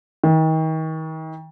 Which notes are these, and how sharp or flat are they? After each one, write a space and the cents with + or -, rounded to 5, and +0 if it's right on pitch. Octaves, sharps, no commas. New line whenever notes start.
D#3 +35